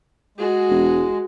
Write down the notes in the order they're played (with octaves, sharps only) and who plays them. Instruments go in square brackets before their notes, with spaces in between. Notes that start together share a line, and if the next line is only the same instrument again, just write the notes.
[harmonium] G#3 [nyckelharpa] F#4 G#4
[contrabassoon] E1